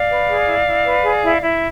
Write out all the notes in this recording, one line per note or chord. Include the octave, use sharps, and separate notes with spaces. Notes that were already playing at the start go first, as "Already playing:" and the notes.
Already playing: D5 F5
B4
G#4
E4
E4
B4
G#4
E4
E4